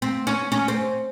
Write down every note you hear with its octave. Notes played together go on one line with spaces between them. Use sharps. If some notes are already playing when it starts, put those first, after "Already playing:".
C4
C#4
C#4
C4